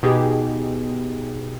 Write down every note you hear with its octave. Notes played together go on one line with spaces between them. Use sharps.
B2 D#4 G4 G#4